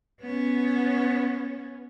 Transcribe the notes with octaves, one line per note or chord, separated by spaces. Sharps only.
B3 C#4